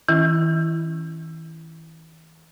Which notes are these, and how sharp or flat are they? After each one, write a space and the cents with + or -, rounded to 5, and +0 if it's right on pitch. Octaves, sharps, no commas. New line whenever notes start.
E3 -40 C#4 -15 E4 +20